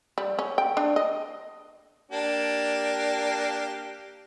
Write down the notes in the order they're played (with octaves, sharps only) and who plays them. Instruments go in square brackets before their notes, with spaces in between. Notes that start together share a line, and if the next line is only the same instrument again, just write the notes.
[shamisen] G3
C#4
G5
D4
D#5
[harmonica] A#3 D4 G4